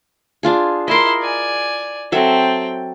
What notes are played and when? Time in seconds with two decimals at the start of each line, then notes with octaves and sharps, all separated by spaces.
0.43 D4 F4 G#4
0.88 E4 A#4 D#5 C6
1.21 D5 G#5
2.12 F#3 C4 A4 E5 G5